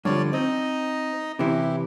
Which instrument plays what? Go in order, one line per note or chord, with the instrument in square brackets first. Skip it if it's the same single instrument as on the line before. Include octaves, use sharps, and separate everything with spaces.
[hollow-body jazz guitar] G2 D3 F3 [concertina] C#5 D5
[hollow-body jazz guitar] C4 [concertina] D#4 D#5
[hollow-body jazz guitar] C3 E3 C#4 [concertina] E4 G4